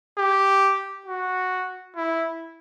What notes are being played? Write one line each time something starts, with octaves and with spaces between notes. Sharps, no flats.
G4
F#4
E4